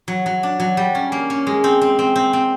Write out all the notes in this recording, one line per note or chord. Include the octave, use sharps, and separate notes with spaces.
F#3
F#3
D4
F#3
G3
C#4
A#3
C#4
G#3
C4
C4
C4
C4
C4